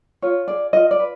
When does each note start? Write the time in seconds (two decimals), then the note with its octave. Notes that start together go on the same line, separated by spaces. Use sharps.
0.22 F4 C#5
0.47 G#4 D5
0.73 F4 D#5
0.91 D5
1.00 B4